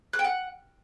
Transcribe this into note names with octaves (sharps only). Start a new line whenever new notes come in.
F#6
G5
F#5